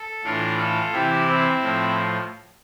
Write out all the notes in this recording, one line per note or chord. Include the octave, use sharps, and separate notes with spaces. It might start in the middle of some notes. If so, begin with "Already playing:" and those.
Already playing: A4
A2 E3 D4 F4
F4 A4
C3 E3 E4 G4
C4 E4
A2 F3